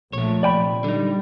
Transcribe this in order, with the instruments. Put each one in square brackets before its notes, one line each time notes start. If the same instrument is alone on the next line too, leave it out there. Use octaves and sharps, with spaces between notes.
[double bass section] A#1 A3 [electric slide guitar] F3 C#5
[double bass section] A#1 C3 [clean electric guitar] D5 G5 B5
[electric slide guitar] D3 D#4 [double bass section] G3